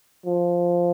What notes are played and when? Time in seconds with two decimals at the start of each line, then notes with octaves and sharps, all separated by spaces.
0.26 F3